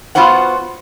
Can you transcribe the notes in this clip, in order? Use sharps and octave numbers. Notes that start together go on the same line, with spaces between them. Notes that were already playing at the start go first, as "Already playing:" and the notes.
B3 F4 F#4 C5 F#5